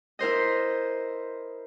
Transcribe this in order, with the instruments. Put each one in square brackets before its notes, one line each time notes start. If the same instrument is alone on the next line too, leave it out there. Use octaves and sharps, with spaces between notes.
[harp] E4 A#4 C5 D#5